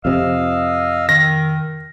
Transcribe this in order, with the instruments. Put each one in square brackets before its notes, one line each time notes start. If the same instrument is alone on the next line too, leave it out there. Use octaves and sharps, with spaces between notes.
[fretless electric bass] F2 C3 [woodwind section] D#5 F5 E6
[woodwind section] D#3 [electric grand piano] A#6